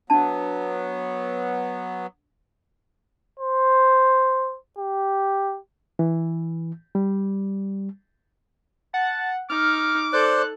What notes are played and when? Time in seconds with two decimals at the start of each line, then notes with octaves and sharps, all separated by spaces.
0.10 F#3 B3 D4 A5
3.40 C5
4.79 G4
5.99 E3
6.95 G3
8.94 F#5 A5
9.50 D#4 D6 F6
10.13 A4 C5 D5 F#6